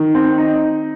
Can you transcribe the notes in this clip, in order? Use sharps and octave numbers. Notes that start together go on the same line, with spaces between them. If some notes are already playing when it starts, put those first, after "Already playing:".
Already playing: D#3
C4
D#4